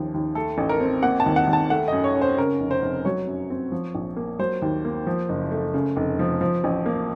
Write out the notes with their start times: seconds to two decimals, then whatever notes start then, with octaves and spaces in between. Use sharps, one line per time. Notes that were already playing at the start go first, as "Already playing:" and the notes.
Already playing: D#2 F3 C#4
0.14 D#2
0.35 A3 A4
0.58 A1
0.69 A#4
0.80 C4
1.03 A#3 F#5
1.20 A5
1.26 D#2
1.36 F#5
1.47 D#2
1.53 A5
1.70 A3 F#5
1.88 F#2 D#5
2.04 C#5
2.15 C#4
2.21 C5
2.38 C#3 A#4
2.60 F1
2.71 C5
2.82 F1
3.05 F#3 C#5
3.27 F#2
3.50 C4
3.72 F3
3.95 A#1
4.16 A#3
4.39 F#3 C5
4.62 D#2
4.85 A#3
5.07 F3
5.29 F#1
5.51 A3
5.74 C#3
5.96 F1
6.19 F3
6.41 F3
6.64 A1
6.86 A#3